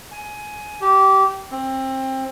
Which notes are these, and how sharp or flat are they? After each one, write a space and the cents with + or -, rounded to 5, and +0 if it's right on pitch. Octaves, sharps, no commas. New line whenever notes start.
G#5 +15
G4 -20
C4 +20